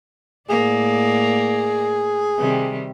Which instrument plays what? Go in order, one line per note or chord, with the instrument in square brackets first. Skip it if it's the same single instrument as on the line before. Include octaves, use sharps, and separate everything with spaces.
[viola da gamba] A2 A#3 D5 [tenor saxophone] G#4
[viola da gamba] C3 D#3 G3